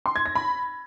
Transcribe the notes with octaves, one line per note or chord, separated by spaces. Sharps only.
C6
G#6
A#6
B5